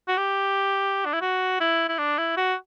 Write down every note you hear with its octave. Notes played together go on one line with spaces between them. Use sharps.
F#4
G4
D4
E4
F#4
E4
E4
D4
E4
F#4